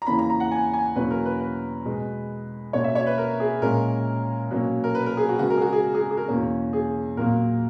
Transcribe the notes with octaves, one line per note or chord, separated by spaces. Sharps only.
A#5
E2 C#3 E3 A#3 C#4 B5
A#5
A#5
F#5
G#5
G#5
E2 B2 F#3 A#3 C#4 B4
A#4
B4
B4
B2 G#3 B3
B2 A#3 C#4 C#5
E5
C#5
B4
A#4
G#4
A#2 G#3 C#4 A#4
B2 F#3 A#3 C#4
A#4
B4
A#4
G#4
F#4
C#3 G#3 B3 F#4
A#4
G#4
F#4
G#4
G#4
G#4
A#4
E2 B2 A#3 C#4
G#4
A#2 F#3 A#3 A#4